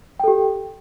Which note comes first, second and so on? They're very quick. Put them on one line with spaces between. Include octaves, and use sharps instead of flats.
G5 A4 G4